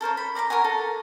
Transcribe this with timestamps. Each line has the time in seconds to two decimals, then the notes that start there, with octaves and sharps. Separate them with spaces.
0.01 A4 A#4 C5 C#5
0.17 B5
0.35 D5 A#5 C6 D6
0.50 A#4 C#5 F#5 G#5
0.64 A4